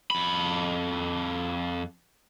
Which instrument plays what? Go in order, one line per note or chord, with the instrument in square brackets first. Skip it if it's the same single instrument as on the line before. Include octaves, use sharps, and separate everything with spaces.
[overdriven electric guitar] F2 B5